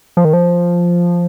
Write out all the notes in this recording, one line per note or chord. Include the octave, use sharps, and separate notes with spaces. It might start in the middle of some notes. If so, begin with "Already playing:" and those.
F3
D#3
F3